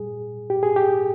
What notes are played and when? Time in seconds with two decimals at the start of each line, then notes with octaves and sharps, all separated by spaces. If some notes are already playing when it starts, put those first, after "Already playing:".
Already playing: A#2 G3 G#4
0.50 G4
0.63 G#4
0.76 G4